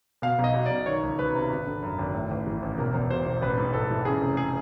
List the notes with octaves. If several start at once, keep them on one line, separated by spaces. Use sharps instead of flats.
B2 F5
B1
D#5
B1
D5
B1
D#3 C#5
C#2
C#2 B4
C3
G#1
D3
F#2
G#1
A2
A1
E3
A1
E1 A#4
E2
E1 C5
E1
A1 B4
G#2
A1 A4
E3
C#3 G#4
F1
G#4